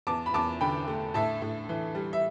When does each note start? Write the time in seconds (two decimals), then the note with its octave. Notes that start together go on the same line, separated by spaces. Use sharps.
0.07 E2 A5 D6
0.26 B5
0.34 E2 A5 D6
0.61 D3 G5 B5
0.87 A3
1.14 A2 E5 A5
1.42 A2
1.69 E3
1.95 G3
2.13 E5